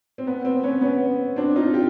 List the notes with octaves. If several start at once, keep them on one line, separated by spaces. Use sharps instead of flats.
C4
B3
C4
B3 C#4
B3 C#4
C4 D4
D#4 F4
F4 G4